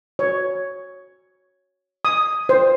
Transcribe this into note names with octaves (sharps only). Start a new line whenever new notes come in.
C#5
D#6
C5